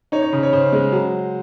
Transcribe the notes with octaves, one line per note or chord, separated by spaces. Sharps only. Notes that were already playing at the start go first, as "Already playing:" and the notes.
D#4 C#5
C#5
C#3
C#5
C#3 C5
G#3
F#3